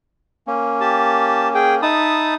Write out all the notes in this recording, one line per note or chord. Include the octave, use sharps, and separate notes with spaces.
A#3 C#4
G4 A5
G#4 G5
D#4 E5 A5 B5 D#6